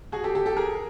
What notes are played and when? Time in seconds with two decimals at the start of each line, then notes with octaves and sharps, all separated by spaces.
0.12 F#4 G#4
0.24 G4 A4
0.35 G4 A4
0.46 G4 A4
0.57 G#4 A#4